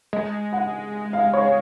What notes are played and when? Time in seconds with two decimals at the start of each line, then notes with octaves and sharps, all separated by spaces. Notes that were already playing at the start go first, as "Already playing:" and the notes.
0.13 G#3 D#5
0.53 F#5
1.13 F5
1.33 C#5